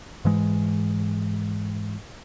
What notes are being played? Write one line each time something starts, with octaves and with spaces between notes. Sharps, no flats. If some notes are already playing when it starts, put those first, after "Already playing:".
G#2 E3 G#3